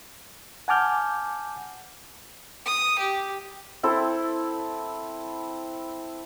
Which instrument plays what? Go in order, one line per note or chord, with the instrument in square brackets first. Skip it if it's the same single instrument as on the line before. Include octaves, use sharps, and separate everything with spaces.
[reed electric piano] F#5 G#5 A5 D6 F6 G6
[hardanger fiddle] D#6
G4
[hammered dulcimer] C4 E4 A4